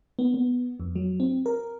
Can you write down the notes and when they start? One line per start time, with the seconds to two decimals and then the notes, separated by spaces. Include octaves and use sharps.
0.19 B3
0.34 B3
0.80 F2
0.96 F#3
1.20 C4
1.46 A#4